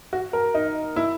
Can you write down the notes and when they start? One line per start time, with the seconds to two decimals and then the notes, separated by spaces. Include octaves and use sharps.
0.13 F#4
0.33 A#4
0.54 D#4
0.96 E4